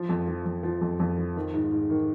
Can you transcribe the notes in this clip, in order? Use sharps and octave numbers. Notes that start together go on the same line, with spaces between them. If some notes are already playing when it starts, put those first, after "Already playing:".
Already playing: F3
F2
F3
F2
F3
F2
F2
F3
D#3
G#2
G#2
D#3